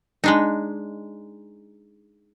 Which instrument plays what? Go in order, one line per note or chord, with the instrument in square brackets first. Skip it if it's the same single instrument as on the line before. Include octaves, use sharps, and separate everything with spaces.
[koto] G#3 D4 D#4